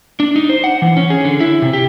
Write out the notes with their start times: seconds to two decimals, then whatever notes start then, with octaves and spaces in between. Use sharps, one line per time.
0.20 D4
0.36 D#4
0.49 C5
0.64 F#5
0.82 E3
0.97 C#4
1.10 G#4
1.25 D3
1.40 E4
1.62 C3
1.73 G4